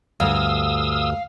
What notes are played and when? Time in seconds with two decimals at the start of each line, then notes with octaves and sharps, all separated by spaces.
0.20 D2 G2 F5 D#6 E6